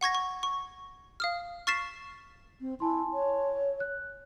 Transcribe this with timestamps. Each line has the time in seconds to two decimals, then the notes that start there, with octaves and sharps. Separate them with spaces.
0.01 F#5 C#6 G#6 A#6
0.15 C#6
0.43 C#6
1.20 F5 D#6 F6
1.67 C#6 F6 A6 B6 C7 E7
2.61 C4
2.80 E4 G#5 A5 C6
3.14 C#5
3.80 F#6